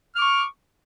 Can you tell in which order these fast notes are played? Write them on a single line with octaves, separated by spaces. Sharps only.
F6 D6 C#6